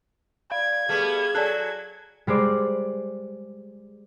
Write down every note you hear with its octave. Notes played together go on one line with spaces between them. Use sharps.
D5 F5 G#6
G3 A3 B3 G#4
F#3 A4 D5 F#6
G3 G#3 C5 D5